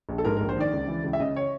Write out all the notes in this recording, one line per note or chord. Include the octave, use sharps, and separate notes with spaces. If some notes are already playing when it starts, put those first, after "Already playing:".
A#1
A4
G#2 A#4
A#4
A#1
C5
D#3 D5
C#2
E3
C#2
E5
C#3 D#5
C#5